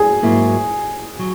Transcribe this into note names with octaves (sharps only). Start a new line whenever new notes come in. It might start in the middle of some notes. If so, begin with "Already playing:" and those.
Already playing: G#4
G#2 F#3 A#3 E4
F#3